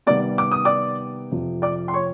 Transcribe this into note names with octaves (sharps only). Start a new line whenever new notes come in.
C3 D#3 G3 B3 D5 D6
D6
D#6
D5 D6
F2 C3 F3
D5 D6
C6
C#5 C#6